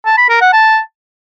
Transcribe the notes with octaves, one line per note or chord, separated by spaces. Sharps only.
A5
B5
A#4
F#5
A5